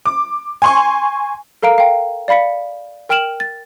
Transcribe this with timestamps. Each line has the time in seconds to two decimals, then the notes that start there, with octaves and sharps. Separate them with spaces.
0.06 D6
0.62 G#5 C6 C#6
1.62 A4 A#4 F5 A#5 D7
1.78 F5 G5
2.28 D5 F5 B5 B6 C#7
3.09 A#4 G5 F6 D7 E7 F#7
3.40 A6